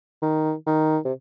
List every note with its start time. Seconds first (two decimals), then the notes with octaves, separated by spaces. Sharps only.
0.22 D#3
0.67 D#3
1.05 C3